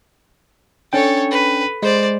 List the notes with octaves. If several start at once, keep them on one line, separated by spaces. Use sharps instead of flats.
C#4 D4 A4 C#5 G5
B4
G#3 C5 D5